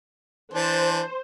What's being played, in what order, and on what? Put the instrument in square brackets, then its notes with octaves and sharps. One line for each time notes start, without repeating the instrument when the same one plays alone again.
[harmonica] E3 D4 A5 [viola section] C5